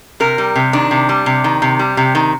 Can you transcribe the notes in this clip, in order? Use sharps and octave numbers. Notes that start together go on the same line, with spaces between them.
C3 A#4
G3
C3
D#3 D4
C3
G3
C3
D#3
C3
G3
C3
D#3